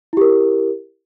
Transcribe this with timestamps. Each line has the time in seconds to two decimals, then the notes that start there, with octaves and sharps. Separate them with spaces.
0.13 E4
0.17 G4
0.21 A#4